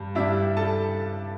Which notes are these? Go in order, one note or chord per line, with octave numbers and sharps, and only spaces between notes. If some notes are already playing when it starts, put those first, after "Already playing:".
Already playing: G2 G3
G2 G3 D4 E4 E5
A4 A5